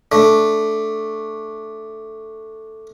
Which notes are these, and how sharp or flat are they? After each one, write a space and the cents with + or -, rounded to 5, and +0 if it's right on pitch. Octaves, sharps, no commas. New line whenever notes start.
A3 +0 D4 +0